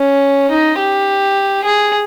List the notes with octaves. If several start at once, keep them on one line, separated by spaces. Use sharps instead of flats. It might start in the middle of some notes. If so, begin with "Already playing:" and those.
Already playing: C#4
D#4
G4
G#4